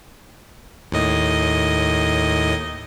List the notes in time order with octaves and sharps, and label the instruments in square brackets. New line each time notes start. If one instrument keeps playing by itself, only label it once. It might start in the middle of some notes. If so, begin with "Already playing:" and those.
[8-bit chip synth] D#2 A2 D#5